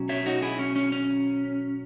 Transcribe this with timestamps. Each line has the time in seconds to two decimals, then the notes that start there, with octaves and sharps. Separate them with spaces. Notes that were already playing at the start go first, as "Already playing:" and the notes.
Already playing: B2 F#3 C#4
0.09 C#5 E5
0.26 D#4 F#4
0.42 E4 G#4
0.59 C#4
0.76 C#4
0.92 C#4